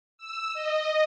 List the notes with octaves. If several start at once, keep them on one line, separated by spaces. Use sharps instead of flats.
E6
D#5